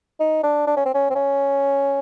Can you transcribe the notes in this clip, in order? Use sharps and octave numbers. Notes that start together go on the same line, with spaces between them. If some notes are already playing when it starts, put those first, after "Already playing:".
D#4
D4
D4
C#4
C4
C#4
C4
C#4